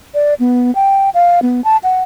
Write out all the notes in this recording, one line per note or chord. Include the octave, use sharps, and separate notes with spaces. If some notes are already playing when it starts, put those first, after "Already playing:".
D5
B3
G5
F5
B3
A5
F#5